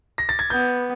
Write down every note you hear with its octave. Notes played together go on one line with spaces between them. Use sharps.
A#6
A6
G#6
B3 G6